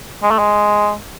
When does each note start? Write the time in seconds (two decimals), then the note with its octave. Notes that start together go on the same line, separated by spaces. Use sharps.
0.23 G#3
0.31 A3
0.39 G#3